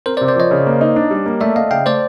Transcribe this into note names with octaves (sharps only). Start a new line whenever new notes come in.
C4 A#4 C5
C5 D5
C3
C5 D5
F3 C#5 D#5
C#3
A#3
D#4
D4
G3
A#3
A3 D5 E5
A3 D#5 F5
C#3 F5 G5
A3 C5 D5